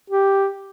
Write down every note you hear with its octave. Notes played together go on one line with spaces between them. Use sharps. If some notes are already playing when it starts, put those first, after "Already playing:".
G4